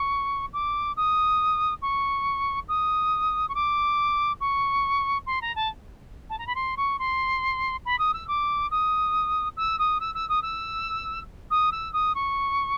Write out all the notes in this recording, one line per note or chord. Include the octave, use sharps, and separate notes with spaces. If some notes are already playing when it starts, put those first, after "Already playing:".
Already playing: C#6
D6
D#6
C#6
D#6
C#6
D6
C#6
C6
A#5
A5
A5
A#5
B5
C6
C#6
C6
B5
D#6
E6
D6
D#6
E6
D#6
E6
E6
D#6
E6
D#6
E6
D#6
C#6